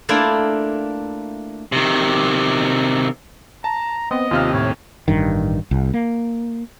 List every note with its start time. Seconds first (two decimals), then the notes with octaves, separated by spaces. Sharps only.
0.09 A3 A#3 D4 E4 F4
1.72 C3 D#3
3.64 A5 A#5
4.11 B3 C4 D#5
4.31 D#2 C3 F4 F6
4.54 A2 C#5
5.08 A1 G2 D#3
5.71 C2
5.94 A#3